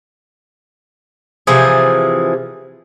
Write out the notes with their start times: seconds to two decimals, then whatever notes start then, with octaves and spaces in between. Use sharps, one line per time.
1.47 C3 E3 F3 G#4